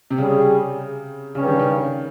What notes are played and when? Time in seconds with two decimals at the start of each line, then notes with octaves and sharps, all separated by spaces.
0.11 C3
0.18 C#3 G3 C#4 G#4
1.35 G2 C#3 G3 C#4
1.47 D#3
1.59 C#3